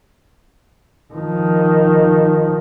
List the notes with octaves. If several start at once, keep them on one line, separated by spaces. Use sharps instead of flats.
D#3 F3